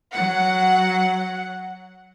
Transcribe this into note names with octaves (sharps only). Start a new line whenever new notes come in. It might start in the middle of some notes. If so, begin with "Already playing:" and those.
F#3 F#5